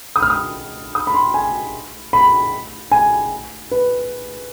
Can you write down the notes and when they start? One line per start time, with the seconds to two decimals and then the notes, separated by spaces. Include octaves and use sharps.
0.16 D#6
0.22 F6
0.30 D#6
0.95 D#6
1.07 B5
1.14 C6
1.34 G#5
2.13 B5
2.92 G#5
3.71 B4